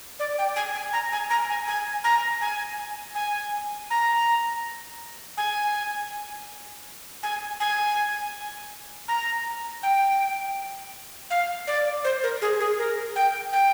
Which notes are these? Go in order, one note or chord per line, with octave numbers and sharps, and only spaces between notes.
D5
G5
G#5
G#5
A#5
G#5
A#5
G#5
G#5
A#5
G#5
G#5
A#5
G#5
G#5
G#5
A#5
G5
F5
D5
C5
A#4
G#4
G#4
A#4
G5
G5